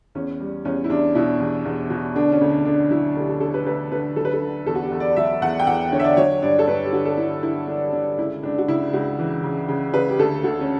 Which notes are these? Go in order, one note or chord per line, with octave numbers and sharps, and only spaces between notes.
E2 C#4
G3
E2 C#4
E4
E2 D4
B2 E4
E2
E2
B2
D3 D4
C#4
D2
D4
D3 D4
F#3 E4
D2 G4
A4
D3 A4
B4
D2 B4
D3 B4
F#3 A4
B4
A4
D3
E2 A4
F#4
G4
E2
D5
F#3 E5
E2 F#5
G5
E2 F#5
D3 C#5
E5
D5
F#3 C#5
G2 D5
A4
G2 B4
G4
D3 F#4
A4
D3 E4
D3 E4
D3 D4
D3 D4
C#2 E4
C#2 D4
F#4
C#3 E4
C#2 F#4
E3
C#3
C#3
C#3 B4
G4
D2 A4
D2 F#4
C#4